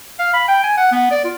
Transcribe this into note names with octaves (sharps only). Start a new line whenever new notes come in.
F5
B5
G5
G#5
F#5
B3
D5
F4